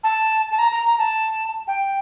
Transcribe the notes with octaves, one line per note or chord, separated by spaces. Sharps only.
A5
A5
A#5
A#5
A#5
A5
G5